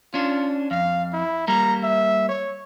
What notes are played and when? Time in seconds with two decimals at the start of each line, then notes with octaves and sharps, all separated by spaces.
0.14 C#4 D4 F4
0.71 F2 F5
1.13 E4
1.48 G3 A#3 A#5
1.83 E5
2.29 C#5